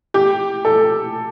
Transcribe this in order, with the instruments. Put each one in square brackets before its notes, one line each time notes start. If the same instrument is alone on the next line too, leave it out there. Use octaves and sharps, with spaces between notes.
[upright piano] G4
A4